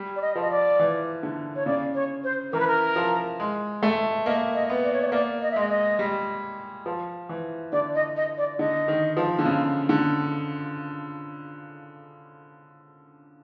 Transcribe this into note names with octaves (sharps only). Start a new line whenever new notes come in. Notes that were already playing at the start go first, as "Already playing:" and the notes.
Already playing: G3
D5
D#5
F3 D#5
D5
E3
D3
C#5
C#3 D5
C#5
C5
E3 A#4
B4
A#4
F3
G#3
A3
A#3 D#5
D#5
B3
D5
C#5
D5
C#5
A#3 D5
D#5
E5
G#3 D#5
D#5
G3
F3
E3
D3 D5
D#5
D#5
D5
D3 D#5
D#3
F3
D3
C#3
D3